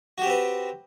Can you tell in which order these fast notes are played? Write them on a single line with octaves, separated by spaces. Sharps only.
F#4 G4 C4 B4